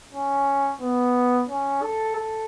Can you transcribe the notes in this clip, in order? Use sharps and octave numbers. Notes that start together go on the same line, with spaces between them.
C#4
B3
C#4
A4
A4